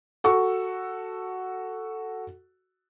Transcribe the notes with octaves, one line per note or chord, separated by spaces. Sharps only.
F#4 A4 C#6